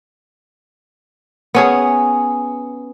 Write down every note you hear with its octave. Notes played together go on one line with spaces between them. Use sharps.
B3 C#4 G#4